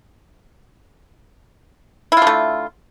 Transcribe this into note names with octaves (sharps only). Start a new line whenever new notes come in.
D3 A3 E4 F4